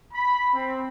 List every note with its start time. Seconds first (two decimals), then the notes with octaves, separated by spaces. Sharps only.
0.13 B5
0.54 C4